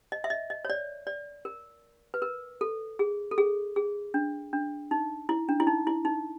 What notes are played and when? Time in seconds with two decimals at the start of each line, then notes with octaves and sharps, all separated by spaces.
0.12 D#5
0.24 E5
0.30 D#5
0.50 D#5
0.65 C#5
0.70 D5
1.07 D5
1.45 A#4
2.14 B4
2.22 A#4
2.61 A4
2.99 G#4
3.31 A4
3.38 G#4
3.76 G#4
4.14 D4
4.53 D4
4.91 D#4
5.29 E4
5.49 D4
5.60 E4
5.67 D#4
5.87 E4
6.05 D#4